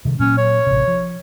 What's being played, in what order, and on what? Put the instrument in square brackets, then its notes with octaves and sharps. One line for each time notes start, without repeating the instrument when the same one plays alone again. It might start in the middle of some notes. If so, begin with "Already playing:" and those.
[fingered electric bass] C3 D#3 G3
[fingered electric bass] A#2 F#3 A#3 [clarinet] C#4
[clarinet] C#5
[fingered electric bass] A1 C3
F3